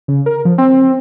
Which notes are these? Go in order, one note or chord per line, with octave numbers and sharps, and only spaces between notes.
C#3
A#4
F3
C4